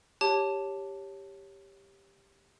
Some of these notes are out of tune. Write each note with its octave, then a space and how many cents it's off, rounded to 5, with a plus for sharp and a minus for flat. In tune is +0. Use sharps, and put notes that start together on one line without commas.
G4 +5 C#5 +0 A5 +0